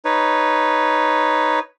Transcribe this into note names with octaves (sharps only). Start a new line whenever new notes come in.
D#4 B4 C#5